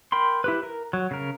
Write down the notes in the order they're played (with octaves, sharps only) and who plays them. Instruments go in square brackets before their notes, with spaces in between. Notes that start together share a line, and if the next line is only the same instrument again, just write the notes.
[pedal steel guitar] A#4 G5 B5 C6
E4 G4 B4
A#4
F#3
C#3 A#4